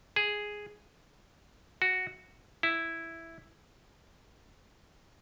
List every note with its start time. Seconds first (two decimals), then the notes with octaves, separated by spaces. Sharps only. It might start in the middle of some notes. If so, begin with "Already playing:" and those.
0.16 G#4
1.82 F#4
2.63 E4